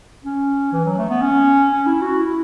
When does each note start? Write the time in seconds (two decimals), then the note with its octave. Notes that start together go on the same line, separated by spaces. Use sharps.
0.25 C#4
0.73 E3
0.85 F#3
0.98 A3
1.10 B3
1.22 C#4
1.71 C#4
1.86 E4
2.02 F#4
2.18 E4